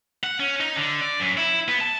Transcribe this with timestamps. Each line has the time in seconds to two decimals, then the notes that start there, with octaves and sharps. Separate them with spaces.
0.24 F#5
0.40 C#4
0.60 D#4
0.76 D3
1.01 D5
1.20 F#2
1.37 E4
1.68 B3
1.81 A5